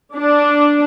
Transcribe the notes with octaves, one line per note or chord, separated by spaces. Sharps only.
D4